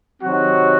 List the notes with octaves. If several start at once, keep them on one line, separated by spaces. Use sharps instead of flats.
C3 D#3 F#3 C4 F#4